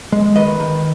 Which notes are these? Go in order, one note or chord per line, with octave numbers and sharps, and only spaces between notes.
G#3
D#3 B4 D#5
D#3